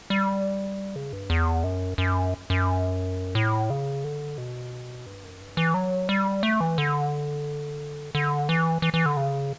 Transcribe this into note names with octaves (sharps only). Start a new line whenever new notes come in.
G3
C#3
G2
E2
F#2
F#2
F#2
A2
C#3
D3
B2
G2
F#2
G2
E3
F#3
G3
A3
E3
D3
D3
E3
E3
E3
D3
C#3